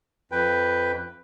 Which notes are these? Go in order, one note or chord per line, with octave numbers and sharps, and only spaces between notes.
F2 B4 G5